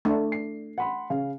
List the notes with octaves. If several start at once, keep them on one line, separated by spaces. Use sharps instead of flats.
A3 D4
C7
F#5 B5 C6
C#3 F5